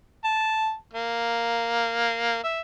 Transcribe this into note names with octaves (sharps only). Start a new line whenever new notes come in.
A5
A#3
E5